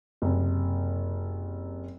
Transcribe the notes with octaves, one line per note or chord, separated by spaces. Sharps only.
F#1 C3